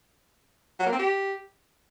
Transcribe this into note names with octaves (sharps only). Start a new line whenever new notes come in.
F#3
A#3
C4
G4